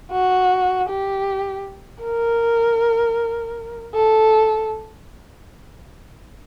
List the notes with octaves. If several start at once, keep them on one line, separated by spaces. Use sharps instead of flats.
F#4
G4
A#4
A4